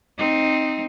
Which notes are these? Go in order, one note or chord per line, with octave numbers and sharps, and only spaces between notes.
C4 D#4